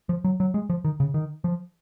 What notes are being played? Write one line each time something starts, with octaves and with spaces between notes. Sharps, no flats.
F3
F#3
F#3
G#3
F3
D#3
C#3
D#3
F3